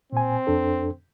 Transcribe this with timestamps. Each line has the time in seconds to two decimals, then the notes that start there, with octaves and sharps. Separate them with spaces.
0.13 A#2 C4 G#5
0.47 F2 D4 A4